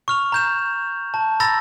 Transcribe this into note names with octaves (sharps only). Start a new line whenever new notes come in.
C#6 F6 F7
A#5 G6 E7
A5
A#5 B5 E6 A6 A#6